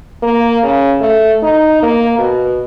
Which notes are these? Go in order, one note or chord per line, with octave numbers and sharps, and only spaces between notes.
A#3
C#3
A3
D#4
A#3
B2